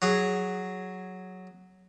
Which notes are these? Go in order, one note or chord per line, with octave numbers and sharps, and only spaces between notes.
F#3 G#4